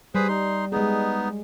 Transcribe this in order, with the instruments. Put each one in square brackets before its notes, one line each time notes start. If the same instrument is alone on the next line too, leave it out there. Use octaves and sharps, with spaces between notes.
[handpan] G3 [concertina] G#4 B4 C5
[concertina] D#4 C6
[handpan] G#3 G#4 [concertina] B3 D#4